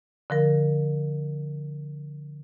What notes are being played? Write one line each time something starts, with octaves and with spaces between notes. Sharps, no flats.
D3 F3 A#4